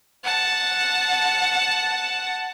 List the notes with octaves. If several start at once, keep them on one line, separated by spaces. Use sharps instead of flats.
F#5 A5